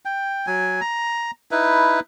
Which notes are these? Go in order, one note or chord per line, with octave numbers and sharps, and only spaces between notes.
G5
F#3 G#5
A#5
D#4 E4 B4